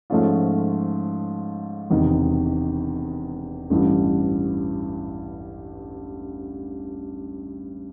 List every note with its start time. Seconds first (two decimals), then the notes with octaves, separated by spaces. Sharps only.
0.10 G#2 F3 A3 C#4 F4
1.90 E1 E2 C3 D#3
3.70 A1 G2 E3